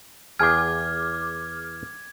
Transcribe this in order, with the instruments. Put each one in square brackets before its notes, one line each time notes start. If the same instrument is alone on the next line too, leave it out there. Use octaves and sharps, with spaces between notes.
[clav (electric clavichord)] E2 G#4 G5 [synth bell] D6 F6 [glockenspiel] G#6